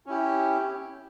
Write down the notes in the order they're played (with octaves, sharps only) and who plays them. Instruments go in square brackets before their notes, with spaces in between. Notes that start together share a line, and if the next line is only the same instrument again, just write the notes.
[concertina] C#4 E4 G4